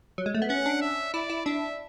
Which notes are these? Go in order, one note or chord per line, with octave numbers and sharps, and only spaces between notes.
F#3
G#3
A3
B3
C#4 F#5
D4
E5
E4 D5
E4
D4 E5